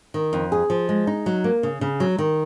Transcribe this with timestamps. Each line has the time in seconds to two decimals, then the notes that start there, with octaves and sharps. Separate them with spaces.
0.14 D#3
0.33 F2
0.52 G#4
0.70 F3
0.89 G#3
1.07 D#4
1.26 F#3
1.44 A#3
1.63 C#3
1.81 C#3
2.00 F#3
2.18 D#3